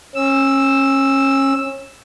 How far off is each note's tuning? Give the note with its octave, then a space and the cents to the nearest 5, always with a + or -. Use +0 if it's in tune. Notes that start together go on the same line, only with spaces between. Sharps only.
C#4 -30 E6 +0